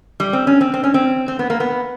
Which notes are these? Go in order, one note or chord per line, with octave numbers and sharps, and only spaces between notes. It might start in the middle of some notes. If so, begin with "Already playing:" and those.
G3
C4
C#4
C4
C4
C#4
C4
C4
B3
A#3
B3